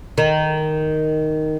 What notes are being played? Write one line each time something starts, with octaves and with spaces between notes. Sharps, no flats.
D#3